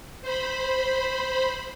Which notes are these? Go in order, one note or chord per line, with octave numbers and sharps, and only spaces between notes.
C5 B5